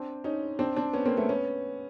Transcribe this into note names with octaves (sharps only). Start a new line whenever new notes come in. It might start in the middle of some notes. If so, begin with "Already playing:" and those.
Already playing: C4 D4
C#4 D#4
C4 D4
C4 D4
B3 C#4
A#3 C4
A3 B3
B3 C#4